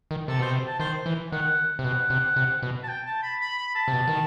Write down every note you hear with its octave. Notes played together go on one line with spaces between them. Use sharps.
D#3
C3 A4
B2 C5
C3
A5
D#3 C5
E3
D#3 F#5
C3
B2 F#5
C3
C3
B2
A5
G5
A5
B5
B5
B5
A5
C3
B2
D#3